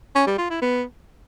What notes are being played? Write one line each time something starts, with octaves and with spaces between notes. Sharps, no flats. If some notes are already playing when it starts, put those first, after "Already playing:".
C#4
G3
F4
E4
B3